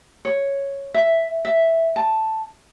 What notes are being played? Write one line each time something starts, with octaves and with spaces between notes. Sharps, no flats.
C#5
E5
E5
A5